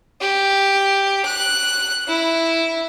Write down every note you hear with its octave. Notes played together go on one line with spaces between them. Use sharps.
G4
F#6
E4